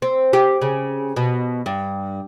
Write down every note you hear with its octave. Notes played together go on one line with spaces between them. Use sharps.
C4
G4
C#3
B2
G2